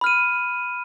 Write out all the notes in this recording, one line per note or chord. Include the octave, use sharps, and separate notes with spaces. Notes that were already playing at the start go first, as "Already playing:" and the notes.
B5 F6 D#7